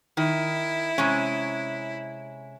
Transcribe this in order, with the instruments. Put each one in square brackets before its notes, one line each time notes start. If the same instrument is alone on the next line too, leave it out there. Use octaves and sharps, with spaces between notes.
[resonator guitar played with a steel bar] D#3 [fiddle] E4
[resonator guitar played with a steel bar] C3 G#3 C#4